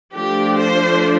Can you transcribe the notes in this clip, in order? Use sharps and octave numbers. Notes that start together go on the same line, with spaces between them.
F3 A3 D4 G4
C5